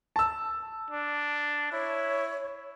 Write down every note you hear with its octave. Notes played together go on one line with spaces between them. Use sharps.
A5 E6
D4
E4 C#5